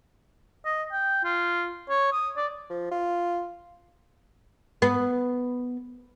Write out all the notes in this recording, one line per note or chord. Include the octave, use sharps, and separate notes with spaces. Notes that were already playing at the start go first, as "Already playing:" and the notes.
D#5
G5
F4
C#5
D#6
D5
F3
F4
B3